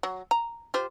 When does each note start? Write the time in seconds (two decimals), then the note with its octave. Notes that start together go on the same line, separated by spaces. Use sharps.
0.03 F#3
0.31 A#5
0.74 F4 G4 C5